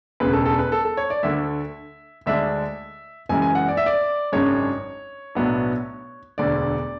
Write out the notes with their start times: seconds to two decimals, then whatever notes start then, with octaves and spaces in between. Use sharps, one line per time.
0.20 E1 D2 C#3 B4
0.33 A4
0.45 A4
0.59 B4
0.72 A4
0.85 A4
0.97 C#5
1.10 D5
1.23 D2 D3 A3 E5
2.26 D2 D3 G#3 D4 E5
3.29 F#1 F#2 E3 G#3 G#5
3.42 G#5
3.55 F#5
3.68 D5
3.77 E5
3.86 D5
4.32 G#1 F#2 C#3 G#3 D4 C#5
5.35 B1 A2 F#3 B3 D4
6.38 E1 D2 D3 D5